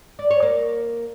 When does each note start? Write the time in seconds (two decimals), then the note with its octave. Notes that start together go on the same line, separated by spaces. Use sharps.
0.19 D5
0.31 C#5
0.42 A#3